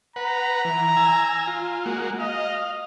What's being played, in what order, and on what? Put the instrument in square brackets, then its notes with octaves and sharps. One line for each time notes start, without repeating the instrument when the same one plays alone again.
[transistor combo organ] B4 F#5 [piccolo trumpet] A#5
[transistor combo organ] E3
G#5 E6
F4
G#3 A#3 F#4
[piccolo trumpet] D#5 [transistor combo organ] F5